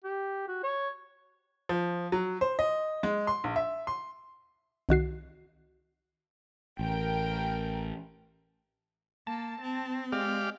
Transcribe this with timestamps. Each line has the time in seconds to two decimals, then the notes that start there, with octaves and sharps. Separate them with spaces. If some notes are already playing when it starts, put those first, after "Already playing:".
0.04 G4
0.48 F#4
0.63 C#5
1.69 F3
2.12 F#3
2.41 C5
2.59 D#5
3.03 G#3
3.27 C6
3.44 A#1
3.56 E5
3.87 C6
4.89 C2 D#3 F#4 C7
6.79 A1 A#4 G5
9.27 A#3 A5
9.61 C4
10.12 G#3 G4 D5 F5